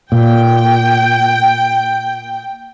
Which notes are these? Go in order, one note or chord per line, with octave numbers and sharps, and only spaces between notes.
A#2 G5